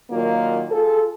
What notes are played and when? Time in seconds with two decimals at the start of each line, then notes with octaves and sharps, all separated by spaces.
0.10 A#2 D#3 F#3 A#3 F4
0.70 F4 G#4 A4